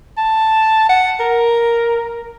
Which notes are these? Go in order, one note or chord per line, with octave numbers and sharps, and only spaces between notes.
A5
F#5
A#4